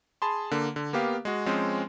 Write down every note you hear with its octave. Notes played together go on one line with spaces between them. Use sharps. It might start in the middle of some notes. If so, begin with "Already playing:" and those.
G#4 A5 B5 C6
D3 A#3
D3
A#3 B3 G4 F5
G#3 F#4
F3 G#3 C4 C#4